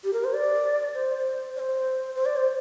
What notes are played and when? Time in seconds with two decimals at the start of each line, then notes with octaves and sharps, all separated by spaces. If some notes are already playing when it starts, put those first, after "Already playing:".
0.04 G4
0.13 A#4
0.24 C5
0.33 D5
0.95 C5
1.56 D5
1.59 C5
2.15 C5
2.26 D5
2.36 C5